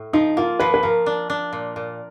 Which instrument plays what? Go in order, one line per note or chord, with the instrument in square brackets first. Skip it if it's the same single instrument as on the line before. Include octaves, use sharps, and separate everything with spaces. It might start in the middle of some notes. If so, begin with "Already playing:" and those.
Already playing: [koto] A2
[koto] F3 [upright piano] D#4
[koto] A#3 [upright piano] F4
[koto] F3 [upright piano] B4
[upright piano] B4
[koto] F3 [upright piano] A#4
[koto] D4
D4
A#2
A#2